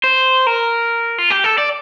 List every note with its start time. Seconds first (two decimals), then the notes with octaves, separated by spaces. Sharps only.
0.04 C5
0.47 A#4
1.18 F4
1.30 G4
1.44 A4
1.58 D5